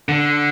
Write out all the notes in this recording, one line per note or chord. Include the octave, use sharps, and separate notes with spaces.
D3